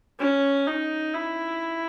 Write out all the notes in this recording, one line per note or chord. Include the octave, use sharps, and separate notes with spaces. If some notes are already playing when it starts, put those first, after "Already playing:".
C#4
D#4
E4